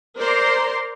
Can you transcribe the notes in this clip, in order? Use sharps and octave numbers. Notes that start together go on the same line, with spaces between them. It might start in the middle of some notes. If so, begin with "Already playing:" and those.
A#4 C5 D5 A#5 C6